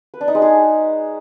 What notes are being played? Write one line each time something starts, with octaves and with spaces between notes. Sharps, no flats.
B4
D4
D#4
G#3
G#4